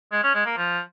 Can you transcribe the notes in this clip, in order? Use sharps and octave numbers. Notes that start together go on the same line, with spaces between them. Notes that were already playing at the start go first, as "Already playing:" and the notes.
G#3
C#4
G#3
A#3
F3